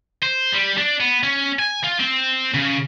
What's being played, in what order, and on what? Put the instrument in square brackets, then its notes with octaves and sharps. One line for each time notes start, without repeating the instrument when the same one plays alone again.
[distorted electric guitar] C5
G3
D4
B3
C#4
G#5
F4
C4
C#3